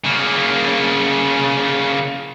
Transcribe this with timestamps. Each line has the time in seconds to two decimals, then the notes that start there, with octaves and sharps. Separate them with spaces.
0.04 C#3 A#3